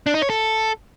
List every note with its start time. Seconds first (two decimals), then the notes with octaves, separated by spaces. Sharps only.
0.06 D4
0.14 D#4
0.22 C#5
0.30 A4